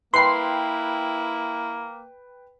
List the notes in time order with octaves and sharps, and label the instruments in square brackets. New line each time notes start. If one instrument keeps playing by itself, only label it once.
[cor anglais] A#3 [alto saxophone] E4 [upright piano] B4 G5 B5 [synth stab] C6 C7